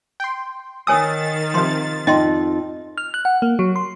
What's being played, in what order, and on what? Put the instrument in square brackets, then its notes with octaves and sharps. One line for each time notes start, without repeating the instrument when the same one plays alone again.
[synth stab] G5 C6
[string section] D#3 A6 [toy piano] C#5 G#5 E6 [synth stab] D#6
[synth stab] C3 F3 [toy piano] C6
[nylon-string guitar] F2 D#4 [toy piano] D#5 G5 C6
[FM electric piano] F6
F#6
F#5
A#3
F#3
C6